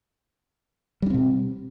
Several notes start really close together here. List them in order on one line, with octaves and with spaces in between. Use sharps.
G3 D4 C4 B2